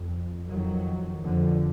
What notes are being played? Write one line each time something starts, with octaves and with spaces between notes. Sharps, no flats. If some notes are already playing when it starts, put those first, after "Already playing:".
Already playing: F2
F2 D#3 F#3
F2 D3 F3